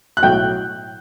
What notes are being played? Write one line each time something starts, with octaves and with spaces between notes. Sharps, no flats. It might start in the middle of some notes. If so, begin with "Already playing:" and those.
F#6
B1 A2 F#3 G5 G6